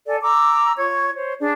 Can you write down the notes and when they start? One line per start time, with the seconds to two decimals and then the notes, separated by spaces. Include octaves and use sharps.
0.07 A4 D5 G#5
0.21 A#5 D6 E6
0.77 F4 C#5 C#6 G#6
1.14 C5 C#5
1.40 D4 G#4 D5